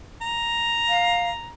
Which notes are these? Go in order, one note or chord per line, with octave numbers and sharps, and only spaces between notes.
A#5
F5